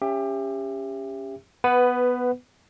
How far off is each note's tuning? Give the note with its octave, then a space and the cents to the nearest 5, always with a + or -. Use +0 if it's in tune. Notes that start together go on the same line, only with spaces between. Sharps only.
C#4 +0 G4 +25 E5 +20
B3 +0 B4 +15 F#5 +0